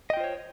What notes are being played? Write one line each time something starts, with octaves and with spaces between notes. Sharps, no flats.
F4 C5 C#5 D#5 G5